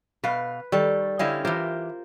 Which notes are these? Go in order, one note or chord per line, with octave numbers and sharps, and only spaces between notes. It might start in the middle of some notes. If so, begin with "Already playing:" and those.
B2 B4 F5
D#3 G3 A4
D3 C#4 E4 G4 D#5 F5
E3 F4 G4 A#4 C5